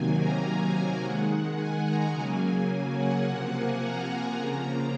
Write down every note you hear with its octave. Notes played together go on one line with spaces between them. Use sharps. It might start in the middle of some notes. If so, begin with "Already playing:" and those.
Already playing: C3 D#3 F#3 A#3 G#5
A#5
D#3 G#3 F#5
G#5
A#5
C#3 F#3 A#3 G#5
G#5
F#5
C3 F3 A#3 F#5
G#5
A#5
C#3 F3 A#3